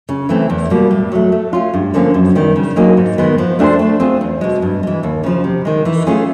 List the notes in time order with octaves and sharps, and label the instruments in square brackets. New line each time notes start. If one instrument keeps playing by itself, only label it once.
[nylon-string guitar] C#3
E3 A3 C4
E2
B2 G3 A#3
A2
F#3 A3
A3
C#4 F4
G2
D3 F3 A#3 C#4
F#2
D#3 G3 B3
C#3
F#3 A#3 D#4 G#4
G#2
D#3 G#3 B3
F3
A3 D4 G4 C5
A3
C4 F4 G#4
E2
B2 G#3
G2
E3 G#3
D#2
C#3 F3
C3
D#3 G#3
E3
A3 C#4 F4 G#4